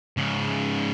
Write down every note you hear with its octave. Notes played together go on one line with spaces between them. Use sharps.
G#2 C#3